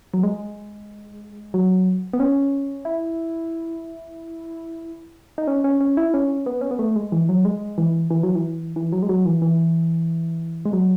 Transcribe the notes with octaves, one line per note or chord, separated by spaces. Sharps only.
F#3
G#3
F#3
B3
C#4
E4
D#4
C#4
C#4
C#4
E4
C#4
B3
C#4
B3
A3
G#3
E3
F#3
G#3
E3
E3
F#3
E3
E3
F#3
G#3
F#3
E3
E3
G#3
F#3